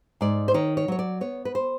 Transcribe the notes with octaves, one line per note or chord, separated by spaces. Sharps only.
G#2 D5
C5
D#3 C#5
C#5
F#3 C#5
D5
B3 C#5
B4
C5